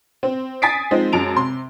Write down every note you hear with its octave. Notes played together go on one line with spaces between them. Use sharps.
C4
G#5 D#6 A6 B6 C7 D7
F3 G#3 C4 D#4
F#2 G#3 A5 D7 F7
C3 C6